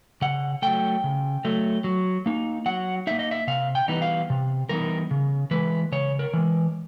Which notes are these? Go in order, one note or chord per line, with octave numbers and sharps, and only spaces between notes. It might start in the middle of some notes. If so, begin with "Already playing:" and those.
C#3 F#5
F#3 A3 G5
C#3
F#3 A3
F#3
A#3 D#4
F#3 F#5
A#3 D#4 E5
D#5
E5
C3 F5
G5
E3 G3 B3 D#4
F5
C3
E3 G3 B3 D#4 A#4
C#3
E3 G#3 B4
C#3 C#5
A#4
E3 G#3